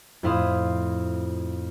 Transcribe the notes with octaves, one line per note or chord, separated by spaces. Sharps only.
F2 A2 E4 F5 C6 D#6